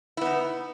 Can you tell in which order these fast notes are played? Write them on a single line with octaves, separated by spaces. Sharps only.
E4 B3 D#4